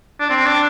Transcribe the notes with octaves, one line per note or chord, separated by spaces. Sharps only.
D4
C4
D4